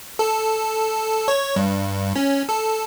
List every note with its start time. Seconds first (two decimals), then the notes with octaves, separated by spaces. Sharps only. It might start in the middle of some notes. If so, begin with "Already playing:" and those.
0.19 A4
1.28 C#5
1.56 G2
2.16 C#4
2.49 A4